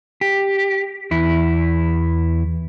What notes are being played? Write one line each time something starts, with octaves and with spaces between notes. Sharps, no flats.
G4
E2 E4